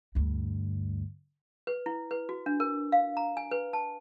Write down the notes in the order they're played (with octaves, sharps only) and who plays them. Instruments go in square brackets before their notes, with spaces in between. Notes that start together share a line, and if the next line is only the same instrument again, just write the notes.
[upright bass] D2 G2
[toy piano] B4
E4
B4
F#4
D4
A#4
F5
A#5
G#5
B4
A5